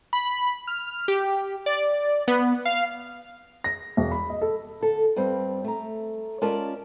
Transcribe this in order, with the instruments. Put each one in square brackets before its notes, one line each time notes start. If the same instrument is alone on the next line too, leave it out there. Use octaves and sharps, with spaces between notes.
[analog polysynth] B5
F6
G4
D5
B3
F5
[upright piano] A#6
E1
B5
D#5
A4
[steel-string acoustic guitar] D3 A4
G2 G3 C4
A3 A#5
G#3 C#4 F4 A#4 D5 A5